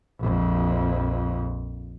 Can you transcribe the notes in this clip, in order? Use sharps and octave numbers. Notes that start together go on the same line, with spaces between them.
A#1 F2